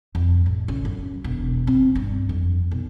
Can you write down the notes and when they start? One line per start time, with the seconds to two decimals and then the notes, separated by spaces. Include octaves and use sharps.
0.15 F2
0.46 A1
0.68 C#3
0.85 F#2
1.24 E1
1.67 C4
1.95 G2
2.29 F2
2.71 B1